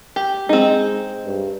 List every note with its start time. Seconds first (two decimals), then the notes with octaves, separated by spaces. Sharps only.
0.16 G4
0.49 G#3 C4 D#4
1.26 G2